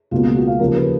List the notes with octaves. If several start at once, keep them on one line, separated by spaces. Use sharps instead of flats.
C#2 B2 A#3 F4
F4
F#4
F5
D#2 C#3 F3 A#4
B4